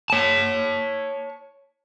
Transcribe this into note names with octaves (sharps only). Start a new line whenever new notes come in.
C#5 A5